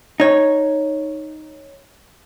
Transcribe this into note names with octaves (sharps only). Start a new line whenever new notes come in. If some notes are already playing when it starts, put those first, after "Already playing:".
D#4 C#5